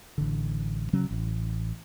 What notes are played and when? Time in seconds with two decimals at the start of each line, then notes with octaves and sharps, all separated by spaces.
0.18 A1 D3
0.93 C#3 F#3 C#4
1.11 A1